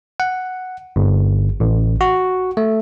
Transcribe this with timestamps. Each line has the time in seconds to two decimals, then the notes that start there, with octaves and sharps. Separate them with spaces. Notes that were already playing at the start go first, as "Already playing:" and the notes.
0.20 F#5
0.96 G1
1.60 A1
2.01 F#4
2.57 A3